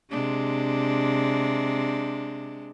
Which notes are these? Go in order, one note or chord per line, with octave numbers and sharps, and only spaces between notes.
C3 G#3 D4